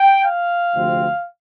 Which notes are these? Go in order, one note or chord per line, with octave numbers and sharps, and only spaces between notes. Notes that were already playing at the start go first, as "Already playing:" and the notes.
Already playing: G5
F5
D2 C3 F3 C4